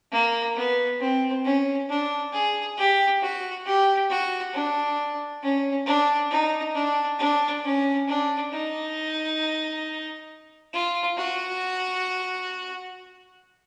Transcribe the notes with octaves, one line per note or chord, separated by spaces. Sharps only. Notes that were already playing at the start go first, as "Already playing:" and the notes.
A#3
B3
C4
C#4
D4
G#4
G4
F#4
G4
F#4
D4
C#4
D4
D#4
D4
D4
C#4
D4
D#4
F4
F#4